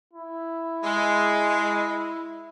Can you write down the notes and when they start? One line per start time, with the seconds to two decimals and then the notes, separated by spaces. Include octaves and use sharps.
0.13 E4
0.83 G#3